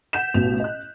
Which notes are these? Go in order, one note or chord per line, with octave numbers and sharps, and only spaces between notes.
F#5 G6 B6 E7
A1 B2 F7
D#5 F#6